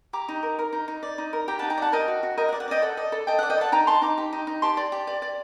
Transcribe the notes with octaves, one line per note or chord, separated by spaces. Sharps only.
G4 A#5 D6
D#4
A#4
A#4
D#4
D#4
D5
D#4
A#4
G4 G5 A#5
D#4 F#5 A5
G5 A#5
D5 F#5 A5
A#4 D#5 G5
F#4
F#4
A#4 D#5 G5
F#5
D5
F#5
D5 D#5 G5
A4 F#5
D5 D#5
A4
A4 D#5 G5
D5 F#5
D#5 G5
A4 F#5 A5
D#4 G5 A#5
D#4 A5 C6
D#4 A#5 D6
G4
D#4
D#4
G4 A5 C6
D5
G4
D5
D5